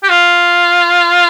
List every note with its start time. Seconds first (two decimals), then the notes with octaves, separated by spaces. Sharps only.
0.03 G4
0.09 F4